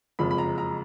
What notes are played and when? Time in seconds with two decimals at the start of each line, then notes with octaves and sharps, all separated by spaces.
0.19 F#1 F2 F3 G#3 B5
0.31 B5
0.38 A#5
0.58 A#5